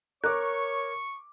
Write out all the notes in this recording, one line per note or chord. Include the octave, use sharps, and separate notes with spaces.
A#4 C#5 C#6 D6 F#6